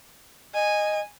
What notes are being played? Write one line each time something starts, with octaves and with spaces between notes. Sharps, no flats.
D#5 G#5